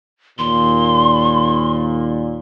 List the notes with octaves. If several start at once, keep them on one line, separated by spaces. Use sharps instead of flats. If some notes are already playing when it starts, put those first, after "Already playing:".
D#2 A#2 C6